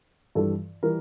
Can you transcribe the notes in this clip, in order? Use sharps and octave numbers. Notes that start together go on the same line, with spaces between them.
G2 E3 G3 A4
E3 G3 A#4